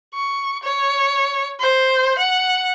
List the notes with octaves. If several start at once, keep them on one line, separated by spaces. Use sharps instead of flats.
C#6
C#5
C5
F#5